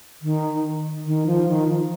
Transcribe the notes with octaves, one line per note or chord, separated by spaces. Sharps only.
D#3
D#3
F3
D#3
F3